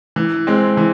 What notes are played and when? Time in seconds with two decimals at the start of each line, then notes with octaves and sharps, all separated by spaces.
0.16 E3
0.47 G#3 C4
0.77 E3